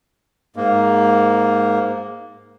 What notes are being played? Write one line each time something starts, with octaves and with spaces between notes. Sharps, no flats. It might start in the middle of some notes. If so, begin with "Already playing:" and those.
G#2 A#3